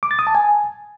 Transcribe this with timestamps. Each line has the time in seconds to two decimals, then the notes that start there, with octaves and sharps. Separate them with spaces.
0.03 D6
0.11 A6
0.19 D#6
0.27 A5
0.35 G#5